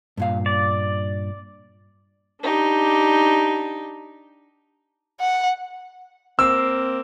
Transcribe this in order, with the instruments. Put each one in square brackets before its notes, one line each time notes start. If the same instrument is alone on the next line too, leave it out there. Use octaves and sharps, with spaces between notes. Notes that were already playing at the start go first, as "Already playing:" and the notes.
[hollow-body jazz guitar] G2 A#2 F5
[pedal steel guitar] D5
[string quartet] D4 D#4 G4
[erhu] F#5
[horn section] A#3 C4 [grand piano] E6